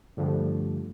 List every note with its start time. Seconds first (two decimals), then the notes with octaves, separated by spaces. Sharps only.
0.17 G2 D3 F3 G3 A3